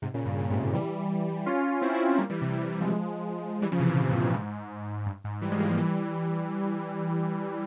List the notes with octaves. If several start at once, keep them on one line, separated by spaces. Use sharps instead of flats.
G#2 C3
A#2 C#3
G2 A#2
A#2 C#3
G#2 C3
G#2
E3 G3
C#4 F4
C4 E4
C4 E4
C4 E4
G3 A#3
E3 G3
C3 E3
C3 E3
E3 G3
F3 G#3
E3 G3
C#3 F3
C3 E3
A#2 C#3
G2
G#2
G2
G#2
E3 G3
F3 G#3
G3 A#3
F3 G#3
E3 G3